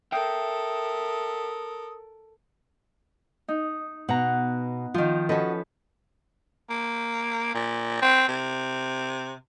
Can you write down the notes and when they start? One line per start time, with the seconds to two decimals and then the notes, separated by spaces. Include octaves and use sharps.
0.12 A4 A#4 E5 G5 D#6
3.48 D#4
4.09 B2 F#5 A#5
4.94 D#3 F3 F4
5.29 C#4 F#4 A4 B4 D#5
6.70 A#3
7.54 A#2
8.02 C4
8.28 C3